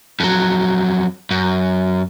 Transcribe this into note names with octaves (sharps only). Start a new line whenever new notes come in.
F2 F#3
F#2